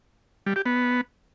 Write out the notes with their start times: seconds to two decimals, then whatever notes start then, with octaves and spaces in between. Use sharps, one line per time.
0.46 G3
0.56 G4
0.66 B3